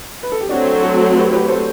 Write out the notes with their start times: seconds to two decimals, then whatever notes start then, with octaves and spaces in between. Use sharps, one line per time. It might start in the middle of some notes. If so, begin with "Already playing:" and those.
0.23 B4
0.32 A4
0.41 G4
0.49 F#3 A3 C4 D4 F#4
0.82 F#4 A4
1.15 G4 B4
1.32 G4 B4
1.48 A4 C5